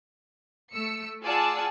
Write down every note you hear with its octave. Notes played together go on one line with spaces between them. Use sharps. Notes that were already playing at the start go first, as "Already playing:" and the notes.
A3 E6 C#7
F4 G#4 D5 F#5 A5 E6